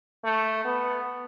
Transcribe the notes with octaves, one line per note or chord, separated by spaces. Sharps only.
A3
B3